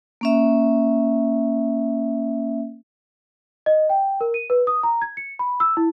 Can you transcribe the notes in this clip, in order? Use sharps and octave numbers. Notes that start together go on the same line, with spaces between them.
A#3 C#4 E5
D#5
G5
A#4
D#7
B4
D#6
A#5
G#6
C#7
B5
E6
E4